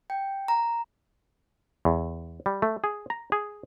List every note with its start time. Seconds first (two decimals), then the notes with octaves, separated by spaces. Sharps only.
0.10 G5
0.48 A#5
1.85 E2
2.46 G3
2.62 A3
2.84 G#4
3.10 A#5
3.32 G#4